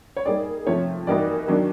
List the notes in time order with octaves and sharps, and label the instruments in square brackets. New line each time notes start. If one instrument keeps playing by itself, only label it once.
[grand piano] C#5
[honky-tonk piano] G3 A#3 D#4 G#4 [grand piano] D5
[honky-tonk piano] C3 F3 A3 [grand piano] C#5
[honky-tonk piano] E3 G3 A#3 D#4 F#4 [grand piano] D5
[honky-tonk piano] D#3 F#3 A#3 D4